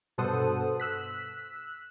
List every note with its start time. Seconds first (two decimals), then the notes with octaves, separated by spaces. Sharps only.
0.18 G2 B2 A4 C5 F#5 D#6
0.80 E6 F#6 B6